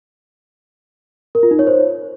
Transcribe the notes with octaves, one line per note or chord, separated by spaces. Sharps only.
A#4
F4
D#4
C#5
C5